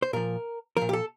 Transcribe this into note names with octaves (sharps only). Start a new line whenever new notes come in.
C5
A#2 F3 A#4
A#2 F3 A#4
G4
A4